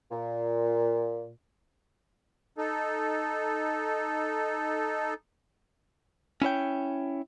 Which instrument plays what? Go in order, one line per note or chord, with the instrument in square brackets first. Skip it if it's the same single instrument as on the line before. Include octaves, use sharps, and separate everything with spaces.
[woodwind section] A#2
[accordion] D#4 A4
[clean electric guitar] C#4 E4 C#5 G5